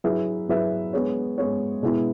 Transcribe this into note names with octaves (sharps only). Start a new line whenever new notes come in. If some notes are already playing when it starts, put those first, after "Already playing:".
F#3 E4 G#4 B4 E5
F#3 E4 G#4 B4 E5
G#3 B3 G#4 C#5
G#3 B3 G#4 C#5
B2 G#3 B3 E4